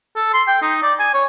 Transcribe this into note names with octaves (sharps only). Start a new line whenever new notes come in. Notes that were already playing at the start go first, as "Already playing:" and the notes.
A4
C6
G5
D#4
D5
G#5
C#5